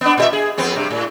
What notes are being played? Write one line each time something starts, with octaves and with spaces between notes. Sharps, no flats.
B3 D4
A#2 G#4 E5
G#4
F2 B3 C4
G2 C3
A2